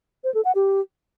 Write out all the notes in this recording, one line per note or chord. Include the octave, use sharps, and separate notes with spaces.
C5
A4
F#5
G4